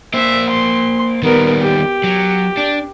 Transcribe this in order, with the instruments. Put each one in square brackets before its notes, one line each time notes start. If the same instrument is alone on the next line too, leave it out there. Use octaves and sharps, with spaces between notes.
[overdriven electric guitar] A#3 C5 [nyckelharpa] E5
[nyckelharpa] C6
[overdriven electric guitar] D#3 G3 [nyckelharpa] B3 A#4
[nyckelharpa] G4
[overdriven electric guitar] F#3
D4